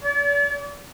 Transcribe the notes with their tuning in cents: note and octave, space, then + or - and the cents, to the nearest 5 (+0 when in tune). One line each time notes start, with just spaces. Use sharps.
D5 -40